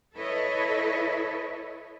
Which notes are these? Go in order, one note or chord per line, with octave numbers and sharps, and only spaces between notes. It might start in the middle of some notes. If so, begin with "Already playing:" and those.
E4 A4 B4 C#5 D#5